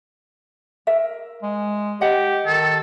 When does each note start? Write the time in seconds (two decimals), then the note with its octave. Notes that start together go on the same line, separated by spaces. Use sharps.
0.87 A#4 E5
1.43 G#3
2.01 G4 D#5 F#5 G5
2.46 D#3 A4